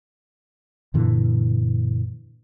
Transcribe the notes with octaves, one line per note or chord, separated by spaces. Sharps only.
F#2 A#2 D3 E3